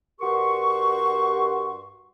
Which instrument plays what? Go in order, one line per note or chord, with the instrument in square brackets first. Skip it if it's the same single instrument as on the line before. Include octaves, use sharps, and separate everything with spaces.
[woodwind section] G2 F#4 G4 A#4 C6 C#6